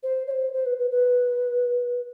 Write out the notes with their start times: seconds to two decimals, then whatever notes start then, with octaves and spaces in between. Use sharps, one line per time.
0.03 C5
0.27 C#5
0.31 C5
0.53 C5
0.66 B4
0.78 B4
0.91 B4